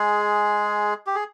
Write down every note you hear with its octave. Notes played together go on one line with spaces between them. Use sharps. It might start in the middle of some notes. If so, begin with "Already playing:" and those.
Already playing: G#3 G#4
G4
G#4